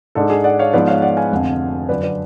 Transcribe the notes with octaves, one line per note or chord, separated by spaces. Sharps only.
G#2 G#3 D4 A4
G#4
D5 F#5
C#5 F5
G#2 F3 B3 B4 D5
C#5 F5
D5 F#5
F5 G#5
F1 F2 D3
F#2 D3 F#3 B4 D5
B4 D5